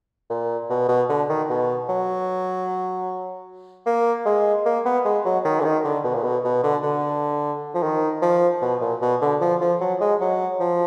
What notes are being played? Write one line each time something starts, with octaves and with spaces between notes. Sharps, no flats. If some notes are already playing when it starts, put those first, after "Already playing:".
A#2
B2
B2
D3
D#3
B2
F#3
A#3
G#3
A#3
B3
G#3
F#3
D#3
D3
D#3
D3
B2
A#2
B2
B2
D3
D3
F3
D#3
F3
B2
A#2
B2
D3
F3
F3
F#3
G#3
F#3
F3